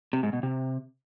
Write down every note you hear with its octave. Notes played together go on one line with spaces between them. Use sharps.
C3
G#2
B2
C3